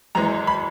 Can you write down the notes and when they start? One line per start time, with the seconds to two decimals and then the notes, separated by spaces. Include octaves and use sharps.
0.15 G#1 F#2 E3 G#3 A#5
0.47 B5